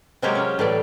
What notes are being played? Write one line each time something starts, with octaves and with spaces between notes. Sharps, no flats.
C3 F#3 G#3 A#3 G4 C#5
C#4
A2 E3 G3 D5